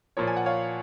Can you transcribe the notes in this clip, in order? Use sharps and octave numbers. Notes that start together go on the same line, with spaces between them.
A#2 F3 A#4 C#5
G#5
F#5
C#5 F5